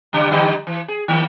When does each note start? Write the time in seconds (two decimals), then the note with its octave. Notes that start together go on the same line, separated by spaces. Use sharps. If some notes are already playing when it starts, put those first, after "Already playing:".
0.13 G2 C#3 G3
0.31 D3 G3 D#4
0.67 E3
0.88 G#4
1.08 D#3 A#3